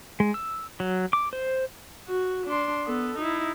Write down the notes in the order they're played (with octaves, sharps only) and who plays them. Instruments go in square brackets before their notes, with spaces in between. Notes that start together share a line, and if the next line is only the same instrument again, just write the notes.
[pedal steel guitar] G#3
E6
F#3
D6
C5
[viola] F#4
D4 C6
B3 A4
D#4 E4